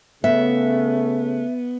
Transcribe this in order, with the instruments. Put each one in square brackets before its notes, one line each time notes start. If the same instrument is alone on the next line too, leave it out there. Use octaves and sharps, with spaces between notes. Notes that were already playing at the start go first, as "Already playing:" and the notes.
[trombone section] C#3 A3 [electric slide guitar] B3 [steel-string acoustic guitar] E5